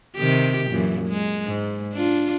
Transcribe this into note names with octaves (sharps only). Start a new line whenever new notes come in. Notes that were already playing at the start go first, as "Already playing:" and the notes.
C3 D#3 G4
F#2 A#2 E3
G#3
G#2
D4 F4